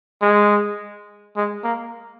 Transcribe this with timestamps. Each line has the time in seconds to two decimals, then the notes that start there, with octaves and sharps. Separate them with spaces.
0.22 G#3
1.36 G#3
1.64 A#3